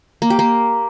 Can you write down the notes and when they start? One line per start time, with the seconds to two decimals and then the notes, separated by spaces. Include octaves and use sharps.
0.22 A#3
0.30 G4
0.39 A#3